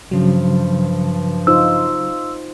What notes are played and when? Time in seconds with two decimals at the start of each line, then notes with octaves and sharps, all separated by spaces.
0.11 G2 C#3 F3 F#3
1.47 D#4 F4 C5 E6